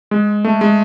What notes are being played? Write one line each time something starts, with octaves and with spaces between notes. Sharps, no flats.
G#3
A3
G#3